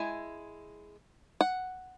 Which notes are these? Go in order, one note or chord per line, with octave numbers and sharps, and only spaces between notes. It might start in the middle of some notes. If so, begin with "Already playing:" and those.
Already playing: G#3 E4 G#5
F#5